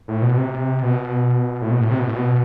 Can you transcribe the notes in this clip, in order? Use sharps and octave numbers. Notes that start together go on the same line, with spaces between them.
A2
B2
C3
B2
A2
B2
A2
C3
B2
A2
B2